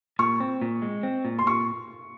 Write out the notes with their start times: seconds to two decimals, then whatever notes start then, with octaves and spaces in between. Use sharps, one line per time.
0.19 A#2 C#6
0.40 C4
0.62 A#2
0.82 G#3
1.03 C4
1.25 A#2
1.39 C6
1.46 A#2 C#6